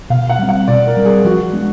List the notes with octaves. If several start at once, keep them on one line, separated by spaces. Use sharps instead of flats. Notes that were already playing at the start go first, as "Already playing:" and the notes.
B2 F5
F#5
G3 C4
F#5
B2 D5
A#4
G3 C4
G#4
F3 F#4
G#3 B3 D4